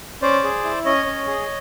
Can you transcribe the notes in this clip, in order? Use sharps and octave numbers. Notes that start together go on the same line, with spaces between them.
C#4 C5 D5
G#4
E4
C#4 C#5 D#5
C#4
G#4